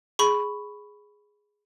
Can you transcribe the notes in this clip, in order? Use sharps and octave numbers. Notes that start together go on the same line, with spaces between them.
G#4 B5 C#6